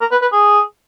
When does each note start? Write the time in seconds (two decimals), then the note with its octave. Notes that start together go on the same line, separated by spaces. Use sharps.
0.01 A#4
0.12 B4
0.22 B4
0.33 G#4